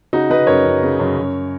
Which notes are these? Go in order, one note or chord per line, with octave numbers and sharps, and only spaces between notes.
C#3 D#4 F#4
C#3 B4 D#5
F#2 A#4 C#5
F#2
C#3
F#2
F#2